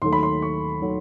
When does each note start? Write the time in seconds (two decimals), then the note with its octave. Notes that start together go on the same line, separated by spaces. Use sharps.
0.02 D#2 D#3 F#3 A3 C6
0.13 B5
0.23 C6
0.42 C#6
0.82 D#3 F#3 A3